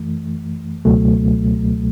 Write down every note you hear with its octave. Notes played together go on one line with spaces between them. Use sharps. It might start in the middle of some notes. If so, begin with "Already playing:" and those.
Already playing: F#2 E3 A3
C#2 B2 F#3 A3